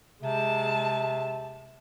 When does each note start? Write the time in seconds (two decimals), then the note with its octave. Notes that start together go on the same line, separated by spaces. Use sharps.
0.23 C3 G#3 A5